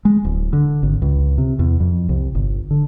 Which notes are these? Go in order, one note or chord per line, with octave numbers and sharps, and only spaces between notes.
G#3
D1
D3
G#1
C#2
C3
E2
F2
C2
G1
D3